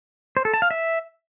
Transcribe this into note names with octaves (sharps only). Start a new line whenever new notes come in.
C5
A4
A5
F5
E5